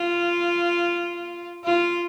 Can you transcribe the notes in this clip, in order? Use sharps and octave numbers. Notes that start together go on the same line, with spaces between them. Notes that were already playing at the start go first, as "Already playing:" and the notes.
Already playing: F4
F4